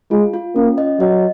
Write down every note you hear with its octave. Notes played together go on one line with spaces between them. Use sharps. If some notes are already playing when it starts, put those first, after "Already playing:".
G#3 F4
F4
A#3 C#4
D#5
F#3 D#5